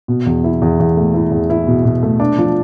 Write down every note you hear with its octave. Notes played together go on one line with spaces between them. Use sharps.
B2
E2
E4
E2
E2
A3
E4
E2
E4
B2
B2
A3
D4
F3